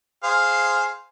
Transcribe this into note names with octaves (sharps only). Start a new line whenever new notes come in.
G#4 C5 F5